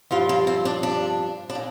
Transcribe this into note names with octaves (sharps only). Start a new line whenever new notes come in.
G2 F3 F4
A#3
C4
D4
D4
D4
A#2